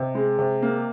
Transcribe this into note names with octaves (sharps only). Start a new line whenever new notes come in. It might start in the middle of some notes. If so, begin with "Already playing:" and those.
Already playing: C3 D#5
G#3
C3
A#3